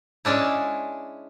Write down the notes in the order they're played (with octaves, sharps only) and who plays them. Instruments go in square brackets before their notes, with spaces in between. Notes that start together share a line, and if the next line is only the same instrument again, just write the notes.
[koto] G#3 C#4 D4 E4